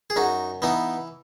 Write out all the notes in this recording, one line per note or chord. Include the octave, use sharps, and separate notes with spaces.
G#4
F#2 D#4 F#4
E3 B3 D#4